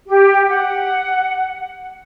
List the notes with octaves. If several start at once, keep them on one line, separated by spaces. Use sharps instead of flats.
G4
F#5